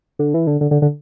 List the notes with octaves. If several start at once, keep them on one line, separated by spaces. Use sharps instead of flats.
D3
E3
D3
D3
D3
D3